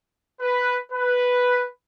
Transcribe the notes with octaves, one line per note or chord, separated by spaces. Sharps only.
B4
B4